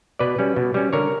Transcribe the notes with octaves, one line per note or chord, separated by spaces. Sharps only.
B2 B4 D5
G3 C#4
B2
G3 C#4
D3 A#4 C#5